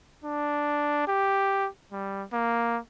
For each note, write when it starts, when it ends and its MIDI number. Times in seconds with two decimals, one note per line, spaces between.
0.25 1.04 62
1.08 1.68 67
1.92 2.25 55
2.33 2.79 58